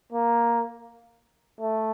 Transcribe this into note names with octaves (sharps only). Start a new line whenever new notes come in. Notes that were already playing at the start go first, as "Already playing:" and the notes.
A#3
A3